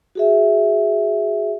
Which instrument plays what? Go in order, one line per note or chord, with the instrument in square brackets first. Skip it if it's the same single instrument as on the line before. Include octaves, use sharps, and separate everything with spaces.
[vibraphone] F#4 G#4 E5